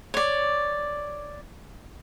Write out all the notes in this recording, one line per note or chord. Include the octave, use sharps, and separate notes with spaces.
C#5 D5